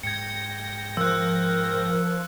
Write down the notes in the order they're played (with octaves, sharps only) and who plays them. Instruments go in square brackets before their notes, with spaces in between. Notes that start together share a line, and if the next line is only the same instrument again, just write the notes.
[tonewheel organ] G#2 G5 A#6 [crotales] G#6 C#7
[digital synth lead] F3 [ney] A#4 [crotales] E6 F#6